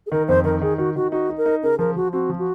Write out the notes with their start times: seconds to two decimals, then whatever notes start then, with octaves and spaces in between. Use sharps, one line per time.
0.06 G#4
0.11 D#3 A#4
0.28 F2 C5
0.44 D#3 A#4
0.62 D#3 G#4
0.78 D#3 F#4
0.96 D#3 F#4
1.12 D#4 F#4
1.29 D#4
1.38 A#4
1.46 D#4
1.63 C#3 A#4
1.79 F3 A#4
1.96 F3 F#4
2.13 C4 F#4
2.30 F3
2.39 F#4